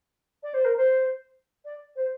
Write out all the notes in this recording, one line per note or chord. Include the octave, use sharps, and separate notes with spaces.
D5
C5
A#4
C5
D5
C5